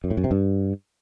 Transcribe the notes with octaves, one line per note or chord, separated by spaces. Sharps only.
F#2
A2
F#2
C3
G2